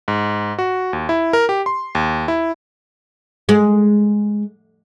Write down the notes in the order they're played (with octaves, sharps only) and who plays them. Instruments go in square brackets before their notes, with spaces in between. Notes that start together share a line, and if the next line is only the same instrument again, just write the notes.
[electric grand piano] G#2
F#4
D#2
E4
A#4
G4
C6
D#2
E4
[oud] G#3